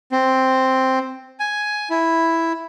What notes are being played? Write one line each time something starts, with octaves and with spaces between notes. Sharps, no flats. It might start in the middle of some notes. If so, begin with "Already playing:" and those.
C4
G#5
E4